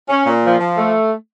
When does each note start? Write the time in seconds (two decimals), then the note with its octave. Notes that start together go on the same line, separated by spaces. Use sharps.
0.09 C#4
0.26 A#2
0.43 F3
0.60 F3
0.77 A3